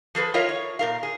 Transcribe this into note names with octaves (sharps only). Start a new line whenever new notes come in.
F3 G#4 A4 B4
E4 F4 A#4 C#5 D#5 F5
C#5
A#2 A#4 F5
G#4